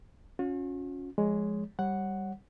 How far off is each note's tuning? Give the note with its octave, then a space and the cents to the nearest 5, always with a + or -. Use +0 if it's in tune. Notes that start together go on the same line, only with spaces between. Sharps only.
C#4 +0 F#4 -45
F3 +0 G#3 +0 C#5 +15
G3 +0 C#5 -25 F#5 +0